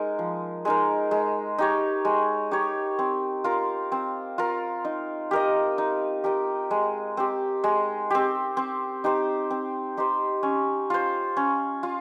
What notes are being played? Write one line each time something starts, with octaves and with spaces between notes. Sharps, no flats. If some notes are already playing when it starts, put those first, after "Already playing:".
Already playing: G#3 D#4 A#4
F3
G#3 D#4 A#4
G#3
D#4 G4 C#5
G#3
D#4 G4 C#5
C4
F4 A#4
C4
F4 A#4
D#4
G4 A#4 D#5
D#4
G4 A#4 D#5
G#3
C4 G4
G#3
C4 G4
C4
D#4 G4 C5
C4
D#4 G4 C5
C#4
F4 C5
C#4
F4